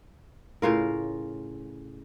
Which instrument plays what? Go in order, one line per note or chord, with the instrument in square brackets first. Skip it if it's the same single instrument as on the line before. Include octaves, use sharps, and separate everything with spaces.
[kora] A2 C#3 F4 A#4